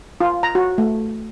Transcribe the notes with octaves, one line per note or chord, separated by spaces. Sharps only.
F4
A#5
F#4
A3